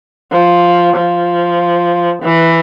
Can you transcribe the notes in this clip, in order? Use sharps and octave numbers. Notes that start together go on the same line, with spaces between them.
F3
F3
E3